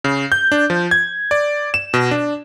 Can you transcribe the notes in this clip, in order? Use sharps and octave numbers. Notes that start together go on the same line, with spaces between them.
C#3
G6
D4
F3
G#6
D5
E7
B2
D4